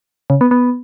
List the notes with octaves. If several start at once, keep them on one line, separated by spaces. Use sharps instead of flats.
C#3
B3
B3